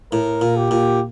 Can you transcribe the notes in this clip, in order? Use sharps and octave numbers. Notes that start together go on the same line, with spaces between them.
A2 A#4
A#2
G4
A#2